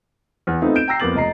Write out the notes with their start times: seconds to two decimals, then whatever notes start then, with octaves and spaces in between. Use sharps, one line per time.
0.47 E2
0.62 A3 B3 C4 D#4 F4
0.75 G6 D7 E7
0.88 G5 A#5 E6 A#6 C7
1.00 F2 A#3 B3 D6 A6 F#7
1.15 F1 D#5 A#5 C7